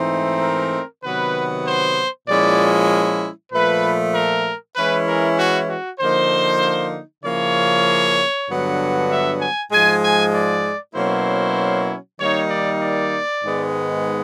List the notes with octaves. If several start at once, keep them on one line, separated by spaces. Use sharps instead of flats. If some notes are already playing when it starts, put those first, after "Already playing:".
Already playing: G#2 E3 A3 C4 D#4
A#4
C3 D#3 F#3 B3 B4
C5
A#2 F3 G#3 C#4 E4 D5
A#2 F3 A3 B4
A#4
E3 G#3 C#4 E4 B4
A#4
F#4
F#4
D3 F3 A#3 D#4 C5
C#3 F3 A#3 C#4 E4 C#5
G2 D3 F#3 B3
E5
G#5
G#2 F3 G#3 G#5
G#5
D5
B2 F#3 A#3 C#4 E4 C5
D#3 G3 A#3 D#4 C#5
D5
D5
G#2 D#3 G#3 B3